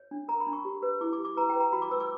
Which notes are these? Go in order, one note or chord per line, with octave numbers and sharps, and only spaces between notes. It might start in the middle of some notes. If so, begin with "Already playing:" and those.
Already playing: C#5
D4
A#4 A#5
B5
D4
C#6
G4
B4
E4 D6
D6
G4
D6
B4 A#5
G5
B4
A#5
F#4 B5
D6
B4 E6
D6